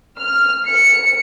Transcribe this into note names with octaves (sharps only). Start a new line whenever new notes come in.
F6
C#7